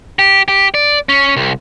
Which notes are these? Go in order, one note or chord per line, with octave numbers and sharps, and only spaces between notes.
G4
G4
D5
C#4
C2